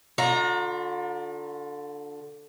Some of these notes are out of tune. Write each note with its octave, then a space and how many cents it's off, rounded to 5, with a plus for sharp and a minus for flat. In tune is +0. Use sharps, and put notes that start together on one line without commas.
D3 +0 F4 +45 A#5 +0